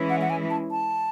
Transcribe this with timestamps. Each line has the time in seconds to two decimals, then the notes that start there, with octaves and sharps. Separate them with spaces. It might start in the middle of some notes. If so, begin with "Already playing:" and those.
Already playing: E3 G#3 C#4 E4
0.10 F#5
0.21 F#5
0.30 G#5
0.50 A5
0.71 A5